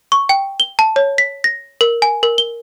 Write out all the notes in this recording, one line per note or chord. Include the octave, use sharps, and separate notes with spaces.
C#6
G5
G7
A5
C#5
B6
A#6
A#4
G#5
A#4
G7